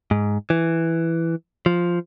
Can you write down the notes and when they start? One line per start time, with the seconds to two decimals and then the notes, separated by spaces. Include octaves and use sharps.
0.11 G#2
0.50 E3
1.66 F3